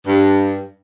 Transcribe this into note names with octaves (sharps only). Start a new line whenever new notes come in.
G2